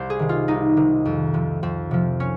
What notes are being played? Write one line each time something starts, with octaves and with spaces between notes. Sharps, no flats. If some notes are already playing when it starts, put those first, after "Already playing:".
Already playing: C2 C5
G#4
C3 D#3
F4
C2 D#4
C3 D#3
F2
C3 F3
F2 C4
C3 F3
C#4